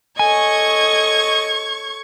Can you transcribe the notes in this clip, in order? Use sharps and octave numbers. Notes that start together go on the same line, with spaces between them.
A4 C#5 D#5 G#5 C#6 G#6